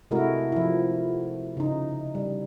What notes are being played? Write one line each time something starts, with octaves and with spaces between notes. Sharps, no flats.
C3 G#3 A3 E4 F#4 A#4
F3 E4
C#3 D#4
G3